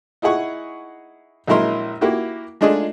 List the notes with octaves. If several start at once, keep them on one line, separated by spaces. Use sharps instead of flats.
D#4 E4 G#4 F#5 C#6
A#1 F#3 G#3 E4 A#4 C6
A#3 E4 F#4 G4
G#3 A3 D4 D#4 F4 G#4